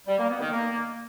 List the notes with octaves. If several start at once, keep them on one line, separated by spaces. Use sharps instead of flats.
G3
A#3
B3
D#3
A#3